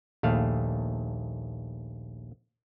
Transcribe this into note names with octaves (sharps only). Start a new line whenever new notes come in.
A#1 D#2 A3 F5